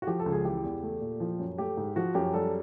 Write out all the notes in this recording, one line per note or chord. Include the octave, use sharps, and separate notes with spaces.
F#4
F3 G4
A4
C#2
G#4
E3 G4
E2
A3
A#2
F3
F#2
A3 G4
G#2
F3 F#4
F#2 G4
G3 A4